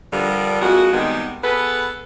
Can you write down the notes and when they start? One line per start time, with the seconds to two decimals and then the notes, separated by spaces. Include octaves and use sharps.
0.13 G2 D3 F3 G3 A#4
0.62 F2 G#3 A#3 F#4
0.93 C3 D#3 G3 G#3 B3
1.44 B3 G#4 A4 B4